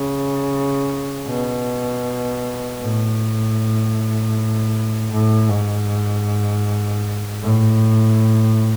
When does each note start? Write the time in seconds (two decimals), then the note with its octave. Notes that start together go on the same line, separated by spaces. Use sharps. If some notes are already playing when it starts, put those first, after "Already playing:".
Already playing: C#3
1.27 B2
2.81 A2
5.12 A2
5.50 G#2
7.42 A2